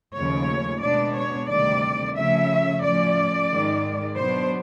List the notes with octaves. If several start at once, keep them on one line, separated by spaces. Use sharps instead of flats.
D#2 C#3 F3 A3 C#5
B2 G#3 B3 D4 D5
C#5
D2 C3 D#3 G3 C4 D5
C#3 F3 A3 C#4 E5
A2 F3 A3 C#4 D5
G#2 D#3 G#3
B2 F#3 B3 D4 C5